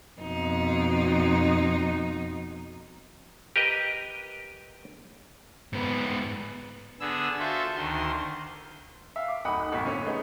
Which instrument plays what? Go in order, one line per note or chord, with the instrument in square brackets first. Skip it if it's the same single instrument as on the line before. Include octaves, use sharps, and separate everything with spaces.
[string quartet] F2 B2 D#4
[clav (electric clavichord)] G4 A#4 B4 D#5
[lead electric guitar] G#2 B3
[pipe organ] D3 B3 G#4 E6
F4 F#4 A4 C5 E5
D2 D#3 C6
[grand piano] E5 F5
D6
D1 D#4 F#5 B5 D#6
G#1 A#2 C#6 B6
D3 C#4 C#5
A3 B3 D#4 G#4